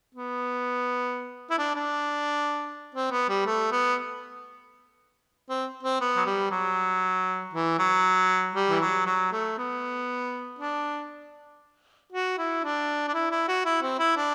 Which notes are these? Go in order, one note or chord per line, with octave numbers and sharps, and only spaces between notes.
B3
E4
D4
D4
C4
B3
G3
A3
B3
C4
C4
B3
F#3
G3
F#3
E3
F#3
G3
E3
F#3
F#3
A3
B3
D4
F#4
E4
D4
D4
E4
E4
F#4
E4
C4
E4
D4